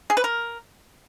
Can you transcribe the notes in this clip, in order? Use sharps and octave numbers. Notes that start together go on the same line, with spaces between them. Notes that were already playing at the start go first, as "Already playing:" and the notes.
G#4
B4
A#4